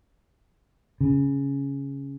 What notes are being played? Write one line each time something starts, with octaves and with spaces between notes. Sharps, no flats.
C#3